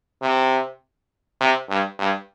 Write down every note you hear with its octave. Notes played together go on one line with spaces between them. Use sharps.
C3
C3
G2
G2